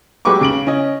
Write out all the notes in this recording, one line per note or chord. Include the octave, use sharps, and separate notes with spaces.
F#3 G#3 G4 B4 C#6 D6
C#3 D7 F#7
C#4 D#5